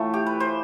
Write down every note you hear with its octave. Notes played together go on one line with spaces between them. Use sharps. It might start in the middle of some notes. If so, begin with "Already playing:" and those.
Already playing: A2 E3 A3 F4
G4
B4
C5